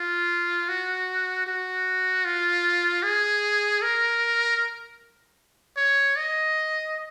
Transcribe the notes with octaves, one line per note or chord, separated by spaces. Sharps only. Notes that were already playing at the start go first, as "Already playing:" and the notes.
Already playing: F4
F#4
F#4
F4
G#4
A#4
C#5
D#5